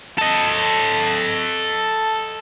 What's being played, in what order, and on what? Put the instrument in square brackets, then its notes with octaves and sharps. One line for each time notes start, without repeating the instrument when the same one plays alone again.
[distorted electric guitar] A4 D#5